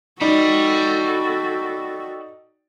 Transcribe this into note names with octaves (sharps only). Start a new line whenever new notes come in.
D#4 F#4 A4 D5 G5 B5